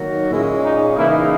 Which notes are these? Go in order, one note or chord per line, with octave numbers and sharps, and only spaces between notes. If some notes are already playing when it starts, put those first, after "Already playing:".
Already playing: D#3 F#3 A#3 D#4
A#2 G#3 C#4 E4
D#4
C#3 E3 A#3 D#4 E4